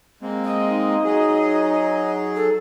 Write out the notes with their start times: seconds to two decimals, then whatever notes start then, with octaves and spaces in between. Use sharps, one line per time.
0.22 G#3 A#3 C4
0.45 D#5
0.67 D#4
1.04 F#3 G#4
2.36 A4